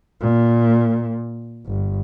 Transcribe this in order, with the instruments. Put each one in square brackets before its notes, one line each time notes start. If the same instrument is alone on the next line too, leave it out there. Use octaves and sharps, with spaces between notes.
[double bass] A#2
G1